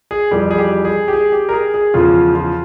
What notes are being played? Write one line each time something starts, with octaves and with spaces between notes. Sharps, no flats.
G#4
F2 E3 G3 G4
G#4
G4
G#4
G4
G#4
G4
A#4
G#4
G#4
E2 C#3 F3 F4
F4